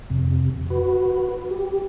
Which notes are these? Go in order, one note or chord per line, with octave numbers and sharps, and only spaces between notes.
F2 C3
F#4 B4
G4